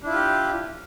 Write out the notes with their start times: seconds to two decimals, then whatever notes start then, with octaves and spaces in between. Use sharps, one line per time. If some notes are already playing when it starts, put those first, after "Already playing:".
0.02 D4
0.06 E4
0.10 F4
0.14 G4